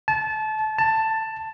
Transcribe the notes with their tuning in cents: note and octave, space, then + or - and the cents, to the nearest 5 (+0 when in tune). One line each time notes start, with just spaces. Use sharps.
A5 -25
A5 +10